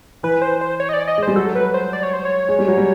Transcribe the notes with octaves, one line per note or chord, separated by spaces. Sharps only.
E3 B4
C5
C5
C#5
D#5
D5
D#5
G#3
C5
G3
F#3 A4
B4
C5
D5
C#5
C5
C#5
G#3
G3
F#3
G3